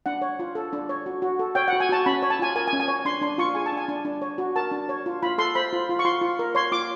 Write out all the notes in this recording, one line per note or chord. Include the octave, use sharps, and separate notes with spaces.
D4 F#5
C#5
F4
A4
D4
C#5
F#4
F#4
A4
C#5 G5
F#5
F#4
G#5
F#4 A5
C#4 B5
C#5
A5
F4 G#5
A#4 G#5
G#5
C#4
G#5
C#5
D4 C6
D4 C6
F4 C#6
G#4 G#5
A5
D4 G#5
D4
D4
C#5
F#4
A#4 A5
D4
C#5
F4
F4 B5
A4 C6
C5 B5
F4
F4
C#6
F4 C6
F4
A#4
C#5 C6
F4 D6